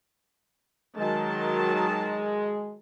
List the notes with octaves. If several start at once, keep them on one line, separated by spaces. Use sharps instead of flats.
D#3 F#3 G#3 A5